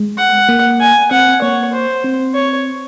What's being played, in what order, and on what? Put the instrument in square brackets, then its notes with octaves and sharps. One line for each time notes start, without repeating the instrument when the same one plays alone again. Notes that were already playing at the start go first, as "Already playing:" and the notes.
Already playing: [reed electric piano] G#3
[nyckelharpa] F#5
[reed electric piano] A#3
[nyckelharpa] G#5
[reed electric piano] C4 [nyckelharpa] F#5
[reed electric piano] A#3 [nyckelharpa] C#5
[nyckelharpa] C5
[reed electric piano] C4
[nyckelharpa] C#5